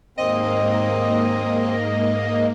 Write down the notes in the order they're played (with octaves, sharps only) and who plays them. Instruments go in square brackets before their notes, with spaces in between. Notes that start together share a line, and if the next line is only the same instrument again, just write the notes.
[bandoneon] D#2 C4 [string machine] G#2 A#3 [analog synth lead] D#5